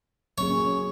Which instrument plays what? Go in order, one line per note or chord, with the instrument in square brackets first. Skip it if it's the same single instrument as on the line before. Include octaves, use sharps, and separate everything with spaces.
[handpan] F#3 A#3 C#4 G#4 [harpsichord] C#5